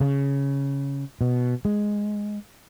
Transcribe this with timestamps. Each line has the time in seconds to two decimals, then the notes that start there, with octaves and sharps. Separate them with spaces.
0.01 C#3
1.21 B2
1.65 G#3